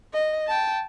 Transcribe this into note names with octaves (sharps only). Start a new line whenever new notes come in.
D#5
G5 A5